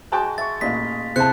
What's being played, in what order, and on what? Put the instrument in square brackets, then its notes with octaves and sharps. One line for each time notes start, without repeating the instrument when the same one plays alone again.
[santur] G#3 F#4 [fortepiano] G5 A5 F#6
[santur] E5 C#6 [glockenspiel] A6
[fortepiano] A1 A#2 [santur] D#5 F5 [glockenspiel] B6
[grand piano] C3 A5 [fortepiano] E4 G#4 C5 [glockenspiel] F#6 C#7